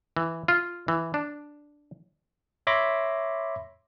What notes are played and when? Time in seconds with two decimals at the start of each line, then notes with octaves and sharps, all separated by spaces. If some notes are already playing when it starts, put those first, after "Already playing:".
0.17 E3
0.48 F4
0.88 E3
1.14 D4
2.67 C#5 E5 B5 C6 D6 A#6